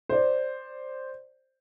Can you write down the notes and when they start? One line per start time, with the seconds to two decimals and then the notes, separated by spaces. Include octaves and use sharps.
0.09 C5 D5